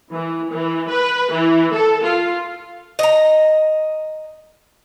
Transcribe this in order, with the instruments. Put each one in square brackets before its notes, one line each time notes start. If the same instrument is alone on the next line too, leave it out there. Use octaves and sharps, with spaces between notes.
[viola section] E3
E3
B4
E3
A4
F4
[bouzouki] D#5 A#5